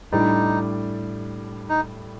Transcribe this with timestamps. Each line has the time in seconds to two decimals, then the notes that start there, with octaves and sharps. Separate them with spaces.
0.12 A2 G3 D4 D#4
1.69 D#4